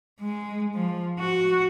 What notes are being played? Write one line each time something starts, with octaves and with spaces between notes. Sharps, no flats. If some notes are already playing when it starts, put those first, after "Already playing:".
G#3
F3
F#4